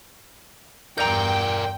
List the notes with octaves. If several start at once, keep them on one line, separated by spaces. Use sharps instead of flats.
E2 G2 A#4 D5 G5 A#5 G6